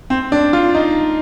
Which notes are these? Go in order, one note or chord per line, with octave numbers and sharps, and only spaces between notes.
C4
D4
F4
D#4